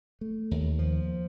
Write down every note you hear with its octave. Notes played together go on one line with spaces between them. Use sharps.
A3
D#2
F3